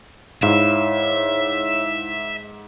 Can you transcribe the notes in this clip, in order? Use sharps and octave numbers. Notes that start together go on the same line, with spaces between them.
G#2 E4 C#5 E5 F5